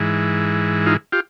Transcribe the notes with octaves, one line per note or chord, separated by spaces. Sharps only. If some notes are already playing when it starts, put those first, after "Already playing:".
Already playing: G#2 E3
D#4 F4
F4 G4